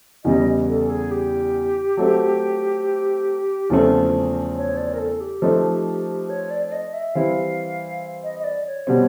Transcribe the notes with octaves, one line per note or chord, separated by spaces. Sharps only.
E2 C#3 E3 G3 D#5
A4
G#4
G4
F#3 A3 C4
E2 C#3 F3 A3 C4 F4
C#5
D5
A#4
A4
G4
F3 A3 C4 D#4
C#5
D5
D5
D#5
E5
E3 G3 C4 E4 F5
D#5
D#5
D5
C#5
B2 G3 C4